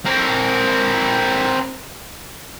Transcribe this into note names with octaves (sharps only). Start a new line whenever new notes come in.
C4 A#4